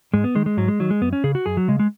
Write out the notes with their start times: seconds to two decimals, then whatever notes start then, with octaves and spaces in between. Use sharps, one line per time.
0.13 G#2 G#3
0.24 B3
0.35 D#3 G#3
0.46 G#3
0.57 G#2 F#3
0.68 G#3
0.80 D#3 F#3
0.90 G#3
1.02 F#2 B3
1.13 C#4
1.24 C#3 G#4
1.35 F#4
1.46 F#2 G#4
1.57 F#3
1.68 C#3 G#3
1.79 G#3